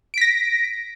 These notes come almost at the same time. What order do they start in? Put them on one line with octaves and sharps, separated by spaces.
D7 B6 A#6